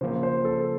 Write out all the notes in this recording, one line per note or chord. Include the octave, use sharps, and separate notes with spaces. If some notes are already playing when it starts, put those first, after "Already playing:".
C#3 F3 A#3 C5
C5
A4